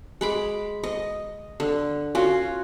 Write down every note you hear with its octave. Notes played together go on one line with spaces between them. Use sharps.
G#3 B5 D6
D#5
D3
C#4 F4 F#4